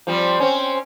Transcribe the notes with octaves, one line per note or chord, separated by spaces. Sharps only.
F3 G3 C4
C4 C#4